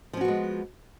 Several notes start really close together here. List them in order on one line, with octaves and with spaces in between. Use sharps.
F3 C#4 F#4 B3 G#3